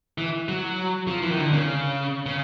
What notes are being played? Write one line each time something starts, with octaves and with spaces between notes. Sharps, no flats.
E3
F#3
F3
E3
D#3
D3
C#3
C#3